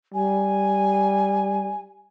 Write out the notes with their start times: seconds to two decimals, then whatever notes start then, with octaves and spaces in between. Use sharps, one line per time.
0.14 G3 G#5